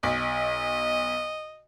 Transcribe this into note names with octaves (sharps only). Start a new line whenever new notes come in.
B1 D#5